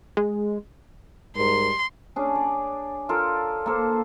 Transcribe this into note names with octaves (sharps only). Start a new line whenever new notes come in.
G#3
G#2 G3 A#4 C6
C#4 D4 G#4
D5
F4 A4 A#4
A#3 A4 C5